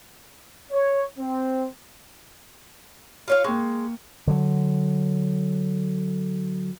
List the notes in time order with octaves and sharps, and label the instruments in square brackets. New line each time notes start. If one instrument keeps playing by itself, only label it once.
[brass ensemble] C#5
C4
[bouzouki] F4 C#5 F5
[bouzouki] G#3 [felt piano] A#3 G5 C#6
[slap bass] D3 F#3